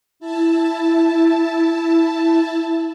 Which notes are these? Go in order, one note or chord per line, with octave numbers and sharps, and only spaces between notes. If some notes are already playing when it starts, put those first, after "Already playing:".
E4 A5